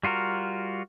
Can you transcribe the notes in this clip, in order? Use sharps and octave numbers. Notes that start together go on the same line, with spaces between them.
G3 F4 F#4 A#4